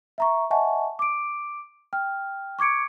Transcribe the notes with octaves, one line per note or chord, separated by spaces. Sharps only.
E5 A#5 C#6
D#5 E5 F#5 G#5 A5 C#6
D6 D7
G5 F6
C#6 D6 G#6 C#7 D7